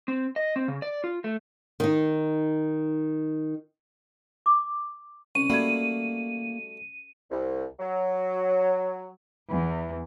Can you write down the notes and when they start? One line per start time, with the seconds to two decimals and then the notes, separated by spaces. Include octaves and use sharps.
0.08 C4
0.36 D#5
0.56 C4
0.68 C#3
0.82 D5
1.04 F4
1.24 A3
1.80 D#3 D#4
4.46 D6
5.35 C2 C#4 D#7
5.50 G3 A3 A#3 F#4 B5 G#6
7.31 C2
7.79 F#3
9.50 E2